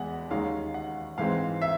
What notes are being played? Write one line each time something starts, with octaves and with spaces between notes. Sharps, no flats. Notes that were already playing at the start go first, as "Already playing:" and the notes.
Already playing: E2 G#3 B3 F#5
D#2 D#3 G#3 C#4 F5
F#5
G#2 E3 G#3 C4 F5
E5